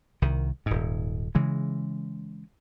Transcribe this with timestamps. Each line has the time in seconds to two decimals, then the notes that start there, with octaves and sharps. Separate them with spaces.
0.22 C2 D#3
0.66 D#1 G#2
1.35 C#3 E3 G#3